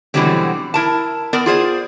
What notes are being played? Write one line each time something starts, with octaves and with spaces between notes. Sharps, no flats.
B2 D3 E3 F#3 G3 C4
E4 A#4 A5
B3 A#4 D5
F4 G#4 C5 D5